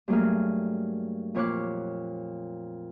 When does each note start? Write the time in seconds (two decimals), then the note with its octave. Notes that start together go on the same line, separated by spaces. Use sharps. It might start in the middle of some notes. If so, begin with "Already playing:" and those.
0.08 G2 F#3 A3 A#3 G#4 F6
1.34 F2 A#2 C#5 F5 D6 F#6